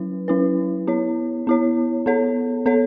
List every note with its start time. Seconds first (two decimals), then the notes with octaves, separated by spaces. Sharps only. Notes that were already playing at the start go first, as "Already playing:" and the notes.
Already playing: F#3 C#4 E4 B4
0.28 F#3 C#4 E4 B4
0.87 B3 E4 C#5
1.47 B3 E4 C#5
2.06 B3 A4 C#5
2.66 B3 A4 C#5